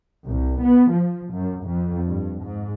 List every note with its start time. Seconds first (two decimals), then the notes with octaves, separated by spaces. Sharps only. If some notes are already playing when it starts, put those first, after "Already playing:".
0.25 C2
0.60 B3
0.91 F3
1.33 F#2
1.65 F2
2.08 G2
2.43 G#2